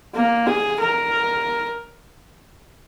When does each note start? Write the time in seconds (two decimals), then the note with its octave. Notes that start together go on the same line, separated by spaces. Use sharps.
0.14 A#3
0.47 G#4
0.80 A#4